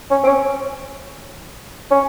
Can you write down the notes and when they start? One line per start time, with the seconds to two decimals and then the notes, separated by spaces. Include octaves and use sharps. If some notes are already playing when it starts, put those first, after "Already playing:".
0.11 C#4
0.23 C4
0.28 C#4
1.91 C#4